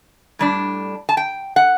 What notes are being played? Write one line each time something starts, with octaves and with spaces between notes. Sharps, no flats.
A2 G3 D4
A5
G5
F#5